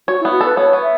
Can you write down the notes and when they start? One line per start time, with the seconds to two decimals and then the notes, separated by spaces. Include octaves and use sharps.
0.08 F#4 C#5
0.21 E4
0.25 B3
0.32 F#4
0.41 A4 B4
0.57 B3 C#5
0.73 B3
0.82 E5